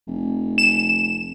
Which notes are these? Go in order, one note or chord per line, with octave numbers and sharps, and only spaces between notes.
F1
E7